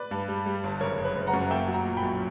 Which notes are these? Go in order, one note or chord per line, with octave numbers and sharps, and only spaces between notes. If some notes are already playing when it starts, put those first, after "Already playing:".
Already playing: B4 D5
G2
G3
G3
G1
F#1 A#4 C#5
F#1
B4
F#1
F#5 A#5
F#2
A#3 E5 G5
F#3
F#5 A#5
A#2
G5 B5
B1